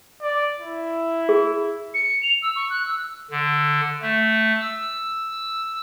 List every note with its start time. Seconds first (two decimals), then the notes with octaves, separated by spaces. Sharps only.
0.22 D5
0.59 E4
1.29 G#4
1.94 C#7
2.23 F7
2.42 E6
2.56 C#6
2.70 F#6
2.86 E6
3.31 D3
4.02 A3
4.61 E6